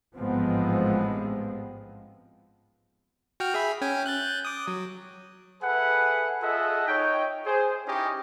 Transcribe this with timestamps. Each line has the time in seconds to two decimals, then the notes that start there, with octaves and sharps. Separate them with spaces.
0.15 A1 G#2 F3 G#3 B3 C4
3.40 F#4 G5 F6
3.54 G#4 E5 B5
3.81 C#4 G5 G#5
4.06 F#6 G6 A6
4.45 D6 D#6
4.67 F#3
5.62 G#4 A4 B4 E5 F#5
6.42 F4 G#4 A4 D#5 E5 F#5
6.87 D#4 C#5 G5
7.46 G#4 C5
7.86 C#4 D#4 E4 G4 C#5 D#5